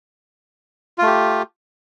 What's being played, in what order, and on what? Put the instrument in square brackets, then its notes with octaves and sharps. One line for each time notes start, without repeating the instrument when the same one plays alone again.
[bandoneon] F4
A3
G4